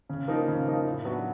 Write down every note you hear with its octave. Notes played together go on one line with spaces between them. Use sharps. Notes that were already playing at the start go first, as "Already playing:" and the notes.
C#3
F3 A#3 D#4
C#3
F3 A#3 D#4
A2
F#3 B3 D4 F#4